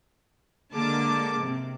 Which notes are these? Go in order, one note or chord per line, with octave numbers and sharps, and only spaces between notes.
D3 G#3 A#3 A5 D6
C3